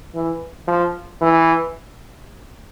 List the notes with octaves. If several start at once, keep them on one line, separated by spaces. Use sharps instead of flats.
E3
F3
E3